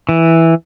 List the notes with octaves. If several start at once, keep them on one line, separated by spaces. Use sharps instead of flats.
E3